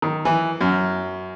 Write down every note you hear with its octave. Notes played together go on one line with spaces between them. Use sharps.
D#3
E3
F#2